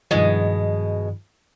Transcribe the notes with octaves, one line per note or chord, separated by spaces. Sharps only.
G2 B2 D#3 F3 G#3